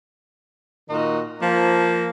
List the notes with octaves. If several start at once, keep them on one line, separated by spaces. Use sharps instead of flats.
A#2 D#3 D#4 F#4
F3 A#3